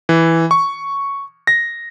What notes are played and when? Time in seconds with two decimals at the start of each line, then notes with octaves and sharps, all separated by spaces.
0.09 E3
0.51 C#6
1.47 A#6